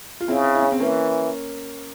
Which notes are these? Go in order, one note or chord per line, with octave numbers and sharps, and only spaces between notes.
F4
C#3 C4 E4
E4
C#4
C4
E3 A#3 C#4